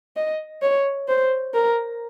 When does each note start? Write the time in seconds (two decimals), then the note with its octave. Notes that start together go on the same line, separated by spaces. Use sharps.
0.16 D#5
0.62 C#5
1.08 C5
1.54 A#4